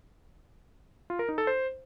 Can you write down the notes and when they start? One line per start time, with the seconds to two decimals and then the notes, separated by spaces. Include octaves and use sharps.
1.10 F4
1.19 A#4
1.29 D#4
1.38 A4
1.47 C5